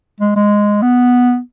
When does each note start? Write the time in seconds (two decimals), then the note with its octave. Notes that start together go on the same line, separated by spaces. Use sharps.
0.20 G#3
0.36 G#3
0.82 B3